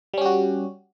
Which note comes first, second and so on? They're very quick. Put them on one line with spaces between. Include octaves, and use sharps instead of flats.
G3 C#4 G4 F#4